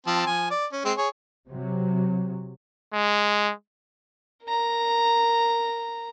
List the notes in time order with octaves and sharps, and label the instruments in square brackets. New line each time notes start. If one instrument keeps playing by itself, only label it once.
[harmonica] F3 C4 A5
F3 G#5
D5
C#4
G#3 C4
G#4 C#5
[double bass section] C3 F#3
[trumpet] G#3
[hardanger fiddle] A#4 A#5